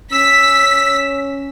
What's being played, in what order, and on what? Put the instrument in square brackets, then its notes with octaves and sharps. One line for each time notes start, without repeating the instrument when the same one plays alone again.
[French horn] C#4 [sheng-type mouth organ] E6 [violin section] B6